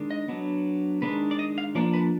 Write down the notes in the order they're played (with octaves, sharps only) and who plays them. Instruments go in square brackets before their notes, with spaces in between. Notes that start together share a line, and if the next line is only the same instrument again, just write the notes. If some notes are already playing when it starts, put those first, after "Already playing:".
Already playing: [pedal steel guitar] D#3 G#3 D4
D#5
F#3 B3 D4
D#3 G#3 D4 B4
D5
D#5
F5
F3 A#3 D4 D5
B4